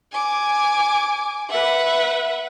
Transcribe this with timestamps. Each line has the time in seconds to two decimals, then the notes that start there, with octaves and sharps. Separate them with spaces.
0.12 G#5 D6
1.49 B4 E5 F#5